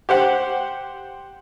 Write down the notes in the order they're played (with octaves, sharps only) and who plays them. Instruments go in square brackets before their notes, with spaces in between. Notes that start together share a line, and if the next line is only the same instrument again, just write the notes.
[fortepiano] G4 C5 F#5